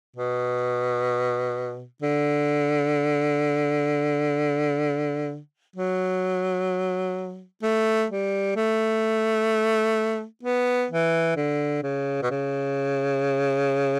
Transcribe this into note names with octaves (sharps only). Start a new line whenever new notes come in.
B2
D3
F#3
A3
G3
A3
B3
E3
D3
C#3
B2
C#3